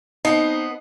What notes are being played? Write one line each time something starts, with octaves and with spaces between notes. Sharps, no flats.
B3 C4 D#4 D#5